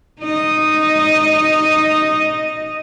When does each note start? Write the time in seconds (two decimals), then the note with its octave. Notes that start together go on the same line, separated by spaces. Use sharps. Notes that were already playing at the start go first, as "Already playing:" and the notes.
0.21 D#4 D#5